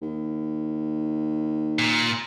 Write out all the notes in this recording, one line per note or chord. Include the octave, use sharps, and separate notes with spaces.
D#2
A#2